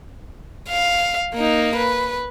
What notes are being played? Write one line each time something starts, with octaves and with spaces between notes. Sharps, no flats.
F5
A#3 D#4
B4